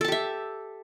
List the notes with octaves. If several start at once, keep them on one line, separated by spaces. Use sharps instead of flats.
G4 A4 E5 A5